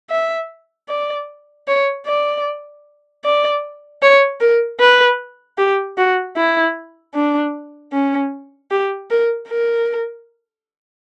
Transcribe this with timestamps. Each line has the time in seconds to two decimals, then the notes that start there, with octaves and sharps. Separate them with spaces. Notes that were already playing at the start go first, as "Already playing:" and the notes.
0.10 E5
0.89 D5
1.68 C#5
2.06 D5
3.24 D5
4.02 C#5
4.41 A#4
4.80 B4
5.58 G4
5.98 F#4
6.37 E4
7.14 D4
7.93 C#4
8.71 G4
9.10 A#4
9.49 A#4